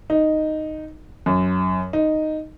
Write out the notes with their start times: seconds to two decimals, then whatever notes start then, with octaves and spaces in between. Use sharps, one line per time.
0.10 D#4
1.26 F#2
1.93 D#4